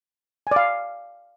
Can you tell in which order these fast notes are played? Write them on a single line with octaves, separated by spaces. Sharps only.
G#5 D5 F5